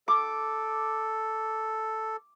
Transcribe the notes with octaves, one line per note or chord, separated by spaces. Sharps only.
A4 D6